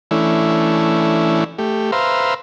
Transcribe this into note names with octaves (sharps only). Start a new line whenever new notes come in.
E3 A3 C#4 D4 E4
A3 G4
B4 C5 E5 F5 A#5 C6